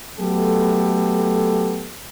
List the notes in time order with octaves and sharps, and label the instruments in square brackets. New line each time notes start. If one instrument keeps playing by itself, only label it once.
[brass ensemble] F#3 A3 B3 G4 A4